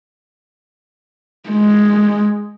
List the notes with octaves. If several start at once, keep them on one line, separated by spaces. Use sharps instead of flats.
G#3